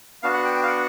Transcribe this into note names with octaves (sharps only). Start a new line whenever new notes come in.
B3 D4 F#4 F5
F#5
G5
G5
F5
F#5